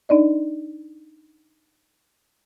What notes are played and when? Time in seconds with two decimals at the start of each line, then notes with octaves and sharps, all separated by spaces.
0.09 D4 D#4 D5 D#5